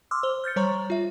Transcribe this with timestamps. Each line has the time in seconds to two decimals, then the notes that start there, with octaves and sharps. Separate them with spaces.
0.11 C6 D6 E6 F6
0.23 C5 G7
0.44 F6 G6 A6 C#7
0.56 G3 C5 C#5 A#5 C#6
0.90 F4 E5